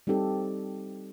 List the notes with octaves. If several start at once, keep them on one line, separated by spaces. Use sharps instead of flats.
G3 C4 D#4 G4 A4